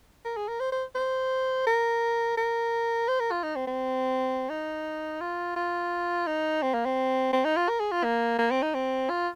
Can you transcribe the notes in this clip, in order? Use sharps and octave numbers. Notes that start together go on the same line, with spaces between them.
A#4
G#4
A#4
C5
C5
C5
A#4
A#4
C5
A#4
F4
D#4
C4
C4
D#4
F4
F4
D#4
C4
A#3
C4
C4
D#4
F4
A#4
G#4
F4
A#3
A#3
C4
D#4
C4
F4